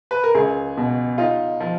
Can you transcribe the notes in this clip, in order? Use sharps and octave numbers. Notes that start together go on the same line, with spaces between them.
B4
A#4
C#2 G#4
B2
D#4 F4
F3